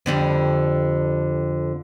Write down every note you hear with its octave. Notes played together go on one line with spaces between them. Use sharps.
F2 D3 G3